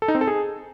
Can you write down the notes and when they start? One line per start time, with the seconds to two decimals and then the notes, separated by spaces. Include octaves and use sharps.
0.02 A4
0.08 D#4
0.15 C4
0.21 A4
0.27 G#4